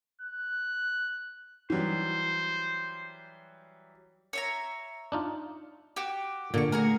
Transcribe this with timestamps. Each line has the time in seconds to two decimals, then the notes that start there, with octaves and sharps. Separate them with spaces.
0.21 F#6
1.70 E3 F#3 G3 C5
4.33 C#5 E5 A#5
5.12 D4 D#4 F4
5.96 F#4 G4
6.54 A#2 D3 A#3 C#6
6.72 A3 F#4 G#4 A#4